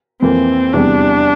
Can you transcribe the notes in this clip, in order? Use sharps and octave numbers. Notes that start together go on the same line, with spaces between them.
F2 E3 A#3 C4 E4
E2 C3 G3 D4